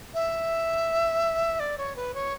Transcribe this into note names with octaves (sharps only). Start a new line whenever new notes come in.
E5
D5
C#5
B4
C#5